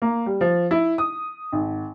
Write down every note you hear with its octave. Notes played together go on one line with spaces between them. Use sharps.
A#3
G3
F3
E4
D#6
G#1